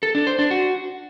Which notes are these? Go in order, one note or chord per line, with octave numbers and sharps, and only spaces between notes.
A4
D4
C5
D4
F#4